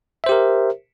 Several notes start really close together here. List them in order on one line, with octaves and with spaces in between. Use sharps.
E5 C5 G4 A#4